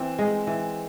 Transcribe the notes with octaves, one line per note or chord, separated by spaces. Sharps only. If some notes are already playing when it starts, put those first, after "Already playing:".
Already playing: E3 C4
G#3
E3